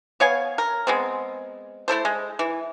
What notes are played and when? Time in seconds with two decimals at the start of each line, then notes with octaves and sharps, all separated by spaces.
0.20 B3 C#5 F5 G#5
0.58 A#4
0.87 G#3 B3 C4
1.88 A3 E4 A4 C5
2.05 G#3
2.39 E3